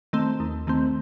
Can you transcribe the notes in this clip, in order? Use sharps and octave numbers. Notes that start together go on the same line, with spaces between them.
D#3 A3 C4
D#2
D#3 A3 C4